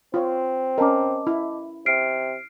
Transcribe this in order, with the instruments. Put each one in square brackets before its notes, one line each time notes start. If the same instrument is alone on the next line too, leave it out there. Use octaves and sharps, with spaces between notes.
[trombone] C4 [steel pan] F4 C#5
[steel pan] C#4 A#4 [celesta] D#5 A5 D6
[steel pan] E4
[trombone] C3 [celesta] F6 C7 D7